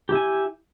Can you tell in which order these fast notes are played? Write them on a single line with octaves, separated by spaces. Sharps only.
G4 E4 G#5